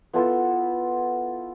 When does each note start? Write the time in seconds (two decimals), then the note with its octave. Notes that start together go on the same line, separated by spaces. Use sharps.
0.13 B3 E4 F4 A4